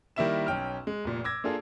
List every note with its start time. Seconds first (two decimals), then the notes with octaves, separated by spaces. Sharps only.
0.16 D#3 G3 A#3 E4 E5 E7
0.47 B1 C#4 G5 F6
0.87 G#3
1.04 F1 A#2
1.24 D6 E6 G#6 A#6
1.44 A#3 D4 F4 G#4 A4